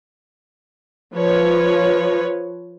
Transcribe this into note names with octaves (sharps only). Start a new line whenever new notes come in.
F3 B4 C#5